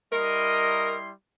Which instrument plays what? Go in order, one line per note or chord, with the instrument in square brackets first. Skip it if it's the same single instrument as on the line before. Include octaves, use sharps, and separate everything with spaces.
[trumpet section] G3 E4 C6 [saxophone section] A#4 [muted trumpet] D#5